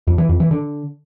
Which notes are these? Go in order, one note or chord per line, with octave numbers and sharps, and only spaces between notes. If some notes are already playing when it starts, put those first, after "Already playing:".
F2
E3
F2
E3
D3